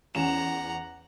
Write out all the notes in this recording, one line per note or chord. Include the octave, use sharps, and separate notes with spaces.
E2 C#4 F#5 A#5 E7